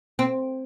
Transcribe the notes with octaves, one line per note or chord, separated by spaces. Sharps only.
C4